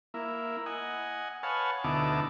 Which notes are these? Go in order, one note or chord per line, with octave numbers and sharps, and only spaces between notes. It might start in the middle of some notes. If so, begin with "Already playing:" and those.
A#3 E4
D#5 F#5 G#5
B4 C#5 F5 F#5 G#5 A5
D2 B2 D#4 E4 A5 D6